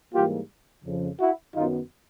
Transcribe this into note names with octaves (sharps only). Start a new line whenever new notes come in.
G#2 E3 G3 A#3 F4 G4
F2 C#3 F3
E4 F#4
F#2 D#3 F#3 B3 D#4 F4